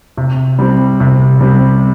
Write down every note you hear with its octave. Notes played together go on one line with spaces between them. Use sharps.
C3
G3 C4
C3
G3 C4